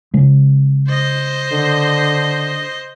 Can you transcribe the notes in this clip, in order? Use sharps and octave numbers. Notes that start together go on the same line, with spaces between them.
C#3 G#3
C5 D#5
D3